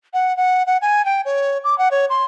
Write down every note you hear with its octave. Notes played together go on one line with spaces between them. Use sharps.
F#5
F#5
F#5
G#5
G5
C#5
D6
F#5
C#5
C6